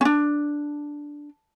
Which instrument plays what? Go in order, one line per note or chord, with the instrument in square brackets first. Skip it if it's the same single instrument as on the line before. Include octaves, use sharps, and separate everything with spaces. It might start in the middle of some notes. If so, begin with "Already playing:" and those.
[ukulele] C#4 D4